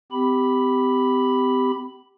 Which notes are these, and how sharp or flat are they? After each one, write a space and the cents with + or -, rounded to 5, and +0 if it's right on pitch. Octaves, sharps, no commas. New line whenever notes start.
C4 -40 G4 +0 B5 +0